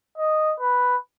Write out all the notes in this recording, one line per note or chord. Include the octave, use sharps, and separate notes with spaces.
D#5
B4